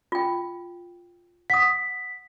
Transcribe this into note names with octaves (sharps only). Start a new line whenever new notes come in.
F4 G5
F#5 D#6 B6